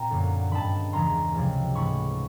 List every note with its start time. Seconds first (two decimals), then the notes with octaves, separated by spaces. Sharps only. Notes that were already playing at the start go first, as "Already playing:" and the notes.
Already playing: A#2 C4 A#5
0.11 F#2 D3 G3 A#3
0.50 G2 D#3 G#3 A5 B5
0.93 E2 C#3 E3 G#3 A#5 C6
1.35 C#2 C3 F3 G#3
1.75 G#2 E3 A3 B5 C#6